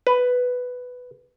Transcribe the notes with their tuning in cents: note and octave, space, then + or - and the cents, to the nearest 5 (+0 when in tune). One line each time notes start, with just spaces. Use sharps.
B4 +5